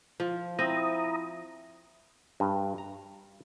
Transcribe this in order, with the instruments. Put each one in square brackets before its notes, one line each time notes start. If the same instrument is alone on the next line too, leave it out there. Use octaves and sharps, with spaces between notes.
[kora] F3
[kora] C4 [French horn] E4 [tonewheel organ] A#5 D#6
[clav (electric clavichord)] G2
A#5